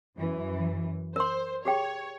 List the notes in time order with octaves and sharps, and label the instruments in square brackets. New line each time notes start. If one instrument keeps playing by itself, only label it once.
[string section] F#2 E3
[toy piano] A#4 C6 [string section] C5
[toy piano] G4 G#4 G5 [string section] C#5